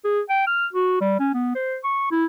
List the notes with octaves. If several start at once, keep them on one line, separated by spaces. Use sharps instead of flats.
G#4
G5
F6
F#4
G3
C#4
B3
C5
C#6
E4